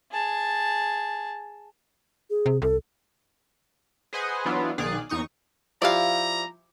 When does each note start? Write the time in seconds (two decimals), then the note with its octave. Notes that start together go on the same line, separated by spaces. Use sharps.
0.12 G#4 A5
2.30 G#4
2.46 C3
2.62 C2 A4
4.13 G#4 B4 C5 D#5 F#5 G#5
4.45 E3 F#3 B3 D4 E4 F4
4.78 B1 D#3 G#4 D5 F5 F#6
5.09 E2 D#4 C#6 D#6
5.82 F3 E4 G4 D5 F5 A#5